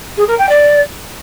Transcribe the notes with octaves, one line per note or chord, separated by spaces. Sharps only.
G#4
A#4
G5
D5